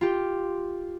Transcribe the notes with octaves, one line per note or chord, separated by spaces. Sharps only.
F4 G4